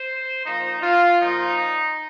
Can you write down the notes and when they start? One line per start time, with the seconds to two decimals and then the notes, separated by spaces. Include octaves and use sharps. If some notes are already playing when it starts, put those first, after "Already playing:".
Already playing: C5
0.44 A#2 F3 D#4
0.82 F4
1.20 A#2 F3 D#4